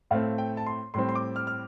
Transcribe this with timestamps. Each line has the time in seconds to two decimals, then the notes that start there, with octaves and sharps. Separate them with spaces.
0.11 A2 A3 C4 F5
0.38 G5
0.57 A5
0.66 C6
0.94 A2 G3 C4 C6
1.09 C6
1.15 D6
1.36 F6
1.47 F6